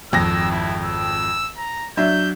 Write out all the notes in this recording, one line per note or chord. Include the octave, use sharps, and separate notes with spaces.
G#1 F2 E6 A#6
E4
E6
A#5
F#3 D4 E5 G6